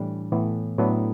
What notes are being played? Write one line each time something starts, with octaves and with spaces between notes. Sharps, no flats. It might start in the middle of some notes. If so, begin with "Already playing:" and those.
Already playing: A2 E3 G3 D4
A2 E3 B3
A2 F#3 B3 D4